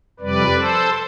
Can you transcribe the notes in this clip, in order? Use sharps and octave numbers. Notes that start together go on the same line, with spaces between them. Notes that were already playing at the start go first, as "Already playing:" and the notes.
F2 C3 G3 B4 D5
A4 C5